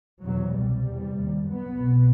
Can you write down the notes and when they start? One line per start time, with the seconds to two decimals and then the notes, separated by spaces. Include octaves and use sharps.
0.23 E2 C3 F#3
0.54 C2 B2 G3
0.84 E2 C3
1.15 D#2
1.46 F#2 B3
1.76 C2 B2